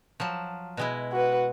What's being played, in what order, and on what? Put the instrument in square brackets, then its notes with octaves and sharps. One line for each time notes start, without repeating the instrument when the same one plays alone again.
[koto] F3 F#3 A5
B2 G#3 E4
[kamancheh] F#4 B4